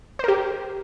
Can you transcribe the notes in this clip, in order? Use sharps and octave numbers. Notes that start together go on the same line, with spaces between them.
G4 A#4 C5